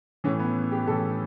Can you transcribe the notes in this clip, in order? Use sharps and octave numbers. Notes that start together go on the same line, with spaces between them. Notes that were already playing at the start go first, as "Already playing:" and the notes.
A2 E3 C#4
B3
G4
A2 E3 A4